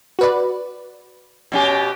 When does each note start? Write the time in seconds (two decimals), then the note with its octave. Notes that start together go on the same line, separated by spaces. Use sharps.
0.19 F#4 B4 D5
1.52 B2 C#4 G4